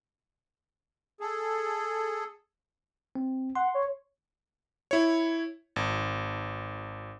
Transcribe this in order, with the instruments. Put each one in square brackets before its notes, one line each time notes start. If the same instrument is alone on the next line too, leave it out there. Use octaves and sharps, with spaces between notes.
[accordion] G#4 A4
[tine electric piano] C4
[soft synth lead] F#5 [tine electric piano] C6
[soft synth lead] C#5
[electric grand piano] E4 C#5
G#1